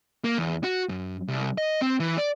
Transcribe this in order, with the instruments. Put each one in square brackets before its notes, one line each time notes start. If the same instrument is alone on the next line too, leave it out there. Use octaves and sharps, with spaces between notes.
[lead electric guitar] A#3
E2
F#4
F#2
C2
D#5
C4
E3
D5